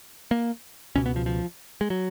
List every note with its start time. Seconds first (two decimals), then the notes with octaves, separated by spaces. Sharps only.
0.31 A#3
0.95 C#2 B2 C#4
1.06 B3
1.16 F3
1.26 F3
1.81 G#3
1.90 F#3